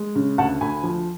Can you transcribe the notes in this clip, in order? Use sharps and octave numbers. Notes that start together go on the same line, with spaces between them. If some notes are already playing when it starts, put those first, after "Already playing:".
Already playing: G#3
C#3
D2 F#5 A5
D2 G#5 B5
F3